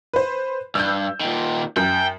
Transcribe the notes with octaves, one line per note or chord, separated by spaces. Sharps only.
B4 C5
G2 E6 G6
A#2 D#3
F#2 G5